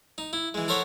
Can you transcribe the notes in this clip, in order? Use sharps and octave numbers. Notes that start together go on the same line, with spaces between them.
D#4
E4
E3 G#3
A4 A#4 C5 C#5 E5 F#5